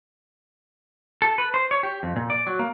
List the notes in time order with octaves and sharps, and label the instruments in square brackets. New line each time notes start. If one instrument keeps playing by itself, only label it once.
[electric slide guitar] A4
B4
C5
C#5
G4
F2
A#2
D5
F#3
A#3